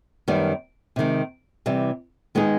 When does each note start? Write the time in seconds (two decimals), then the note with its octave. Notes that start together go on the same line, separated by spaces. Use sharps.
0.28 F#2 D#3 G3 B3
0.96 C3 D#3 G#3
1.66 C3 E3 G3
2.35 D#3 G#3 B3 D#4 G#4